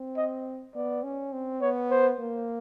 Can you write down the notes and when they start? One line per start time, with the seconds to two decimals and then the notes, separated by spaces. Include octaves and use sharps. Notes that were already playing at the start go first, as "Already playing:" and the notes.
Already playing: C4
0.17 D#5
0.75 B3 D5
1.03 C#4
1.33 C4
1.61 B3 C#5
1.90 C5
2.19 A#3